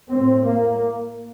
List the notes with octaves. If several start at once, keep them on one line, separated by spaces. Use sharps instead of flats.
A2 C4
A#3